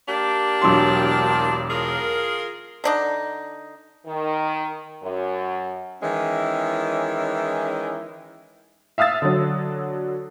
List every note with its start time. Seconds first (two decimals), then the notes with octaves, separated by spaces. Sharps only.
0.09 A#3 D4 G4
0.61 E1 F#3 C6
1.70 F4 G#4 A#4
2.84 D3 D4 D#4
4.07 D#3
5.02 F#2
6.02 D#3 E3 G#3 C#4 E4
8.98 E5 F5 D#6 E6 A6
9.22 D3 F#3